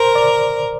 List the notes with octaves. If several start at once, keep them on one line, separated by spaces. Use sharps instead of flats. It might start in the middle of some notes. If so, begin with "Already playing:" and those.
Already playing: A#4 C5
D5